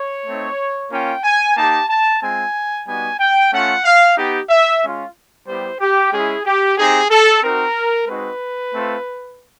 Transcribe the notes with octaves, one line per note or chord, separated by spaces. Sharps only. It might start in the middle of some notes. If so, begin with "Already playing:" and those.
Already playing: C#5
A3 C4 D#4
A#3 C#4 F4 G5
G#5
A#3 D#4 G4 A5
A5
G#3 C4 F4 G#5
G3 B3 D#4 F#4 G#5
G5
A3 C#4 F4 F#5
F5
B3 D#4 G4
E5
G#3 C#4 F4
G3 B3 E4 G4 C5
G4
G#3 C#4 E4 G#4
G4
C4 D#4 G4 G#4
A4
C4 D#4 F#4 A#4
G#3 C4 D#4 F#4 B4
A3 C4 F4